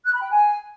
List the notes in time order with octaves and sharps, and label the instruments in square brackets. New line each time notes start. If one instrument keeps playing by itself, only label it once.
[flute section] F#6
B5
G5
G#5